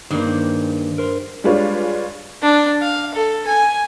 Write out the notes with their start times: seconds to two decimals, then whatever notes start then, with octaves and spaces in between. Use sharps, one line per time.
0.11 G2 D#3 G#3 A#3 C5
0.98 A#4 C5
1.44 G3 G#3 D4 F4 B4 C#5
2.42 D4
2.82 F5
3.14 A4
3.47 G#5